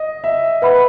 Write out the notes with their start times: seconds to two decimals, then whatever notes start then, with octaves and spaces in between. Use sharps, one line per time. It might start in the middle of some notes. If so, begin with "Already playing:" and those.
Already playing: D#5
0.24 E5
0.62 B4 E5 F#5 B5